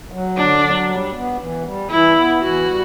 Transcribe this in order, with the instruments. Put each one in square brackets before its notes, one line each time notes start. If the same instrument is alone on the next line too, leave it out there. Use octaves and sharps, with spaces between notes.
[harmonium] F#3
[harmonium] D3 [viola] D4
[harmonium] F#3
G3
B3
E3
G3
[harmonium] E3 [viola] E4
[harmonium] B3
[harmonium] E3 [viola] F#4
[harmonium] G3